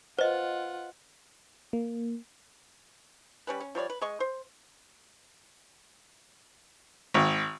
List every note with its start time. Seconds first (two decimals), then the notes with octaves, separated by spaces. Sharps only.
0.19 F4 B4 C5 D#5 F#5
1.73 A#3
3.47 G3 C#4 B4
3.60 C#4
3.75 F3 G3 C#5 D5
3.90 B4
4.01 G#3 D#5 C#6
4.20 C5
7.14 G#1